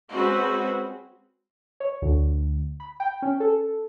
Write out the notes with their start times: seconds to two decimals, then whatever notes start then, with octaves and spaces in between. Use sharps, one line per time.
0.12 G#3 C4 C#4 F#4 B4
1.80 C#5
2.02 D2
2.80 B5
3.00 G5
3.22 C#4
3.40 A4